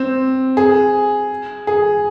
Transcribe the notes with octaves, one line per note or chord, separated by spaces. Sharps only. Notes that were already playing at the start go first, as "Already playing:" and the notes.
Already playing: C4
G#4
G#4